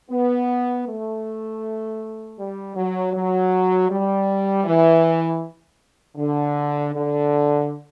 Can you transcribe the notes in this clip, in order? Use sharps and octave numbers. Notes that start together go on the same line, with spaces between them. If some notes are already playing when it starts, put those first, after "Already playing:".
B3
A3
G3
F#3
F#3
G3
E3
D3
D3